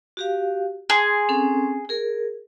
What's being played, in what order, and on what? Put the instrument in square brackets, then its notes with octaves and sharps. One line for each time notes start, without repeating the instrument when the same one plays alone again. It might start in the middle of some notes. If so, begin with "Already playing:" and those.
[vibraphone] F#4 G4 F5
[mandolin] G#4 [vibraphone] C6
[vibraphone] C4 C#4 A4
G#4 A#4